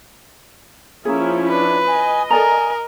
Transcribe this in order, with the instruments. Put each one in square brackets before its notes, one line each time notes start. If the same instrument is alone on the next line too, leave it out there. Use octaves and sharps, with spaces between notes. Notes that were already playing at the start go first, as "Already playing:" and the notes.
[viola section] F3 C#4 E4 [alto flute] A#3 [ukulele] G#4
[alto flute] D4 [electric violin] B4
[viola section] D#5 [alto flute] G#5
[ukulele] A4 D5 A#5 [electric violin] A#4 [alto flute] G#5